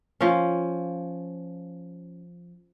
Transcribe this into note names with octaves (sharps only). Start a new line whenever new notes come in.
F3 C#4